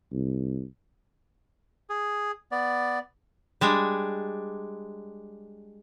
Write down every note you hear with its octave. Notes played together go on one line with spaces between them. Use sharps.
C2
G#4
B3 D5
G3 G#3 D4